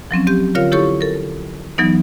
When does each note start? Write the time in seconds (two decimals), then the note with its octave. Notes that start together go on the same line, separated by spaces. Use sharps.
0.11 F3 F#3 C4 C#4
0.27 C4 G4 G6
0.55 D3 F4 A#4 C#5 F5 F6
0.72 E4 G4 A4 C#5 C#6
1.01 A4 A#4
1.78 E3 F#3 B3 D#4